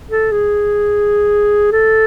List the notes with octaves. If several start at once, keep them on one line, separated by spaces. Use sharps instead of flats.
A4
G#4
A4